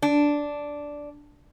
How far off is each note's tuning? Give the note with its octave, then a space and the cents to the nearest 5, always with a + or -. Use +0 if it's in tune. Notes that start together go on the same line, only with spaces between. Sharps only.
D4 -5